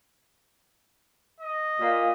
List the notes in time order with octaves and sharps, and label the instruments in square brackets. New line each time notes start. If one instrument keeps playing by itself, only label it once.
[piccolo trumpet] D#5
[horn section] A#2